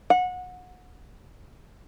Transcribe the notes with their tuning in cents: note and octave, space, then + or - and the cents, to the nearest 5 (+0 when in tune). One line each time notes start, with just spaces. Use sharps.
F#5 -25